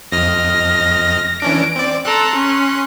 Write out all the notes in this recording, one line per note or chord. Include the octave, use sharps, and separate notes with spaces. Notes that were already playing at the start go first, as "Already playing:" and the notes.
F2 D#5 F6 A#6
E3 C#4 D4 D7
C4 D5
A4 A#5 C6 F#6
C#4